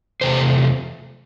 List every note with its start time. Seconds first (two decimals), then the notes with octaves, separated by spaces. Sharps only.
0.21 E2 C3 A3 C5